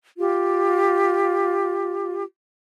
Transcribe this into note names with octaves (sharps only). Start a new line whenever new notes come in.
F4 G4